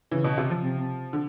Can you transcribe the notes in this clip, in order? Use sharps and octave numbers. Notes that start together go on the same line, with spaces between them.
C#3 E3
B2
C3
F3
C3
D3